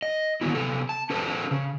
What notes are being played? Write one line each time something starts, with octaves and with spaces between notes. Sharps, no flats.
D#5
D#3 E3 F#3 B3 E4
C3 B3 A4
A5
C#4 G#4 A4 B4 C5
C#3